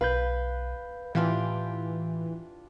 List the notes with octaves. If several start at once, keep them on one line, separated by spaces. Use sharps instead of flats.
B1 B4 F5 B5 G6
A2 E3 D4 F4 G4